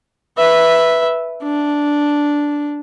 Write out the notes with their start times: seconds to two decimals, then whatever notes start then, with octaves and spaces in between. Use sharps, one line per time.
0.37 B4 E5
1.43 D4